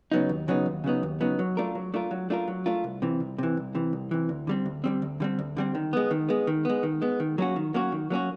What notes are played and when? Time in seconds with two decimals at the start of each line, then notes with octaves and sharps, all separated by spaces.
0.12 C#3 F#3 B3 D#4
0.29 D#2
0.48 C#3 F#3 B3 D#4
0.66 D#2
0.84 C#3 F#3 B3 D#4
1.03 D#2
1.21 C#3 F#3 B3 D#4
1.39 F#3
1.57 A3 D4 F4 A#4
1.75 F#3
1.94 A3 D4 F4 A#4
2.11 F#3
2.30 A3 D4 F4 A#4
2.48 F#3
2.66 A3 D4 F4 A#4
2.84 C2
3.02 C3 E3
3.20 C2
3.38 C3 E3
3.57 C2
3.75 C3 E3
3.93 C2
4.11 C3 E3
4.29 D2
4.47 D3 G3 C4
4.66 D2
4.84 D3 G3 C4
5.02 D2
5.20 D3 G3 C4
5.39 D2
5.57 D3 G3 C4
5.75 D#3
5.93 G#3 B3
6.11 D#3
6.29 G#3 B3
6.47 D#3
6.65 G#3 B3
6.83 D#3
7.02 G#3 B3
7.20 D#3
7.38 F#3 A#3 C#4 F#4
7.56 D#3
7.74 F#3 A#3 C#4 F#4
7.92 D#3
8.10 F#3 A#3 C#4 F#4